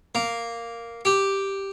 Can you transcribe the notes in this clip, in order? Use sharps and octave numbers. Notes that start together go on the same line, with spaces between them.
A#3
G4